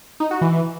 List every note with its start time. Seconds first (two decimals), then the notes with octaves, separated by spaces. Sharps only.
0.20 D#4
0.31 F#4
0.41 E3